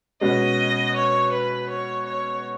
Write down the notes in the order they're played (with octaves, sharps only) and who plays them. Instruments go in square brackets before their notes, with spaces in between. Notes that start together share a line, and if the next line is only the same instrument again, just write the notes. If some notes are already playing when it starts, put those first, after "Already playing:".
[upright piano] B2 G#3 C#4 F#4 [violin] D#5
[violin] C#5
B4
C#5
C#5